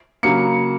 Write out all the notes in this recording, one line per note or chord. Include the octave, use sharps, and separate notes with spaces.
C#3 F#3 A#3 C#7